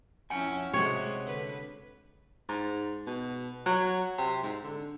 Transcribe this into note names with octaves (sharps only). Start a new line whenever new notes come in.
F2 C#4 E4 F#5 G#5
C3 G#3 C4 F#4 C#5
D3 B4
G#2
B2
F#3
C3
G#2
D3